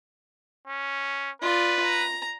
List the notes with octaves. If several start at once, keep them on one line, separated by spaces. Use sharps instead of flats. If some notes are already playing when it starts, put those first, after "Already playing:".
C#4
F4 B4 D5
A#5